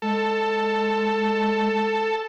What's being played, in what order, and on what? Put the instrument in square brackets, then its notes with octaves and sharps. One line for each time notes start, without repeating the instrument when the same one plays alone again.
[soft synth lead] G#3 [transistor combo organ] A4